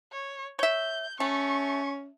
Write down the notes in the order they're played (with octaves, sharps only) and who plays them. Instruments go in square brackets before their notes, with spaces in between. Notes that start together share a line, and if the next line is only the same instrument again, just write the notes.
[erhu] C#5
[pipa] C#5 E5 [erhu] G6
[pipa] A3 [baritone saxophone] C#4 [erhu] C#6